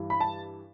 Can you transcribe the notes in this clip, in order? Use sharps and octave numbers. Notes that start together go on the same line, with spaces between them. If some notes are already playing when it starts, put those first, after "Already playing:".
Already playing: G2 E3 G3
B5
A5